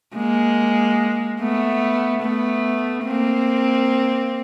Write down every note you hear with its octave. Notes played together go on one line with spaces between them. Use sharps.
G#3 A#3
A3 B3
A3 B3
A#3 C4